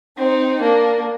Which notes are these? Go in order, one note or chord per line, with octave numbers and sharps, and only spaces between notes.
C4 D#4
A#3 D4